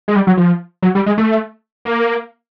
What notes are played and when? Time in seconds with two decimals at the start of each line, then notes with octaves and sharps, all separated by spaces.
0.08 G#3
0.16 G3
0.27 F#3
0.37 F3
0.82 F#3
0.95 G3
1.06 G#3
1.18 A3
1.85 A#3